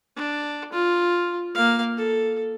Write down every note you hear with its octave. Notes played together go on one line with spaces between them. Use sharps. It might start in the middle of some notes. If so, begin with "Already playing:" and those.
D4
F4
A#3 F5
A4